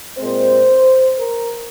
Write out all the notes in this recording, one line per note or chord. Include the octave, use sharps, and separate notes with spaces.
A#2 G#3 C4 C5
A#4